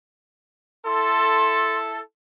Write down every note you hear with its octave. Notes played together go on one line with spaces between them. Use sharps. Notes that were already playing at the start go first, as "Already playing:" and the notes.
E4 A4 C6